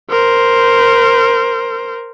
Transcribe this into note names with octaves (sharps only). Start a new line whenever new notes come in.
A#4 C5